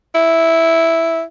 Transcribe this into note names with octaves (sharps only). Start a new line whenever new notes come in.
E4